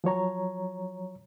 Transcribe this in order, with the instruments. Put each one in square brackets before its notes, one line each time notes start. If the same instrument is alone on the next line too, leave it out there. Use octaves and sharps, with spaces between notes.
[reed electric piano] F3 F#3 C#5 A#5